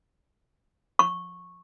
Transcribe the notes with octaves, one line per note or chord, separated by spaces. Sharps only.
C#6